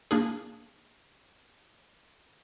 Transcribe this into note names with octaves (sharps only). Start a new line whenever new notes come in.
A#3 D4 G#4